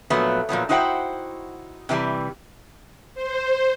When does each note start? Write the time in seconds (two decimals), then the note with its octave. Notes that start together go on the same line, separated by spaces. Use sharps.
0.10 A#2 F3 F#3 A3 B3
0.49 A#2 F3 F#3 B3
0.69 D#4 E4 F#4 C5 F#5 G5
1.89 C3 E3 F#3 G3
3.15 C5